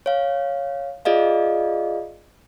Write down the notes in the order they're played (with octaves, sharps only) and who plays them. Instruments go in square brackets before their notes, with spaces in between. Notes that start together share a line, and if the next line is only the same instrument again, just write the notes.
[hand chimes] C#5 F5
F4 G#4 D5 D#5 F5